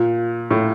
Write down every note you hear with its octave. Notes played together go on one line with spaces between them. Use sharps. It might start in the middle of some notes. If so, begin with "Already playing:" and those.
Already playing: A#2
A2